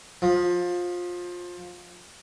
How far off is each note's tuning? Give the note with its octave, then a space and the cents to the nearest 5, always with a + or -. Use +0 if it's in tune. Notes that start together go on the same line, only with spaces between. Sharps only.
F3 +20